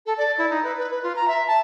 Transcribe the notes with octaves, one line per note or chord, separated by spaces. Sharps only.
A4
D5
E4
D#4
B4
B4
B4
F4
A#5
E5
A5